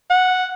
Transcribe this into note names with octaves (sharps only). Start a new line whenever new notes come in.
F#5